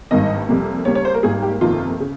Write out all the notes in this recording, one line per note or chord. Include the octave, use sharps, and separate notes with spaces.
G#1 G2 D#3 A#3 D#5
F2 C3 G3 A#3
D#2 C#3 G3 A#3 C#5
C#5
C5
A#4
G#1 G#2 G3 A#3 G#4
G4
G1 F2 C3 D#3 A#3 F4
C#3